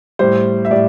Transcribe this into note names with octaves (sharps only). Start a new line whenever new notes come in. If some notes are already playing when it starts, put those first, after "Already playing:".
A2 G3 C5
E5
A2 G3 D5